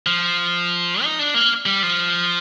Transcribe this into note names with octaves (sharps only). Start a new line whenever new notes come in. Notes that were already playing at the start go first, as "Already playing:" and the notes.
F3
D#4
D4
A#3
G3
F3